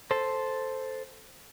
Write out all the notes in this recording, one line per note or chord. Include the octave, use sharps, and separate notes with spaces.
A4 C5